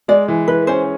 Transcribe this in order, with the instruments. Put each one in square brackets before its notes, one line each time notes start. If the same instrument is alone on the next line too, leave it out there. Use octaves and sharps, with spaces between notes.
[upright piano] G#3 [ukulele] D5
[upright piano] E3
[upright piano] E3 [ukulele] B4
[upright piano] C#4 [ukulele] C5